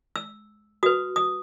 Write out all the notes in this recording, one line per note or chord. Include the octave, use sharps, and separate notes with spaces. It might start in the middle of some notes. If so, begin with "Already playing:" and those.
E6
F#4 B4 D#6
D#6